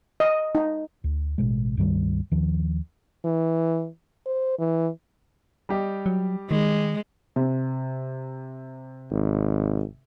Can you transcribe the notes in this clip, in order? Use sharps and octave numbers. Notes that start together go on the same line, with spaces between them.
D#5
D#4
D2
A1 B2 G#3
C#2 G2 D#3 G3
D#2 D#3 F3
E3
C5
E3
G3 G4 D#5
F#3
D#3 G#3
C3
G#1